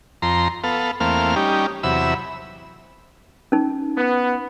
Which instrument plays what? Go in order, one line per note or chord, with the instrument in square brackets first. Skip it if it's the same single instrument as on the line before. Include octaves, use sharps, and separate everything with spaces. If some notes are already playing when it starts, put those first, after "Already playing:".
[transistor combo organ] F2 A#5 C6
B3 A4 F5
E2 A3 A#3 C4 F5 F6
G3 C#4 D#4 G4
E2 C3 F#3 E5 B5 E6
[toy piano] C#4 D#4
[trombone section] B3